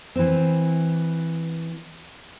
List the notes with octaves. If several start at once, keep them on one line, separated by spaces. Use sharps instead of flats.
E3 C4